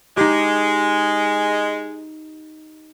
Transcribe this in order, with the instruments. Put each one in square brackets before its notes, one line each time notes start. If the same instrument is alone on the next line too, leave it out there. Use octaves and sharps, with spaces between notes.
[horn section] G#3 [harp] D#4 G4